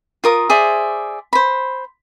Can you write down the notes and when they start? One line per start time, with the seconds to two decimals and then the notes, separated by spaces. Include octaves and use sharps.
0.24 F4 A#4 D#6
0.50 G#4 C5 D5 E5
1.33 C5 B5